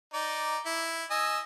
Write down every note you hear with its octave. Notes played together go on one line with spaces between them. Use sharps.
D#4 D5
E4
D#5 G#5 E6